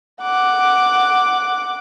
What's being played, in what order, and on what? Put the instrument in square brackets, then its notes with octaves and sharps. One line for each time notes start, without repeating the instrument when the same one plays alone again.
[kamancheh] F#5 D6